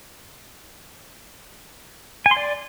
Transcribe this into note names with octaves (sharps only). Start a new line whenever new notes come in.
G#5
C6
D5